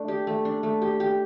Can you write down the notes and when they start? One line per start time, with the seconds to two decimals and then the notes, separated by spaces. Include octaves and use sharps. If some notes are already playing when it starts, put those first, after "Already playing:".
Already playing: A3 D4
0.08 G4
0.27 A3
0.45 D4
0.63 A3
0.82 G4
1.00 G4